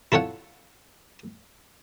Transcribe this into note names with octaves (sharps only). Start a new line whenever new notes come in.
E4 F4 A4 C#5 F#5